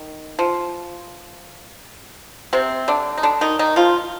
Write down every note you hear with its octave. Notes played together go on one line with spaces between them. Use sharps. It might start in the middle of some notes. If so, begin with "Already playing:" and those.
Already playing: D#3
F3
C3 C4
D3 D4
D#4
D3 D4
D#3 D#4
D#3 D#4
F3 F4